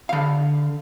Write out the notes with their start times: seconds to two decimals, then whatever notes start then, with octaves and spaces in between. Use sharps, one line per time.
0.09 D3 F5